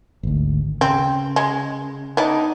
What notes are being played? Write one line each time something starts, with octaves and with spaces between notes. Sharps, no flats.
G#1 D2
C#3 C4
G#3
B3 D4 D#4